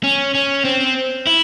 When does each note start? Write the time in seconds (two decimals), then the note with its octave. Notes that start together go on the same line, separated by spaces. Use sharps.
0.03 C#4
0.35 C#4
0.65 C4
1.27 E4